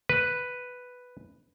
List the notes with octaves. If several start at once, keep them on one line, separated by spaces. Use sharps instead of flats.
B4